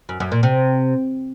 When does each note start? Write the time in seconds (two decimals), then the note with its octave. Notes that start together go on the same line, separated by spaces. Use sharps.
0.09 F#2
0.20 F#2
0.32 A#2
0.43 C3